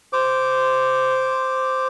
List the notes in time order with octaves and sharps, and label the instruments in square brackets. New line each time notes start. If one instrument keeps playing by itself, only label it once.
[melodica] C5 D6